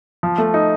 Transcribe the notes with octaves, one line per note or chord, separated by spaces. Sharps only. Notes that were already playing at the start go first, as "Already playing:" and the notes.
F3
A3
D#4